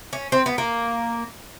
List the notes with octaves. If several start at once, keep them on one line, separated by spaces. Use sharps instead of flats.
C#4
C4
B3
A#3